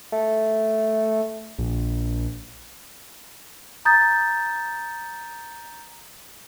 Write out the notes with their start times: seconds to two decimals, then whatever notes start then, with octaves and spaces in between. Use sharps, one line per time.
0.12 A3
1.59 A#1
3.85 A#5 D#6 G6 A6